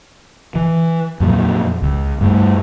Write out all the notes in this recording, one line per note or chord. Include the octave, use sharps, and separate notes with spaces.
E3
F2 A#2 F#3
C#2
G2 A3